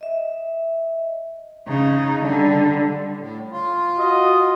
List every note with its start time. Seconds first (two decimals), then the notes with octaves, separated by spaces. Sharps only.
0.01 D#5 E5
1.67 C#3 D#4
2.22 D3 G3
3.17 A2
3.52 F4
3.98 F#4 D#5